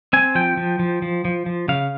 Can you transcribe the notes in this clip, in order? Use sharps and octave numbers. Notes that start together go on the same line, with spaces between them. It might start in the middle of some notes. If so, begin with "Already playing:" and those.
C4 G#5
F3 G5
F3
F3
F3
F3
F3
C#3 F5